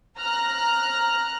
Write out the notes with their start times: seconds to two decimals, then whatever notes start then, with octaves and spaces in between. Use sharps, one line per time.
0.18 A#5 F6 F#6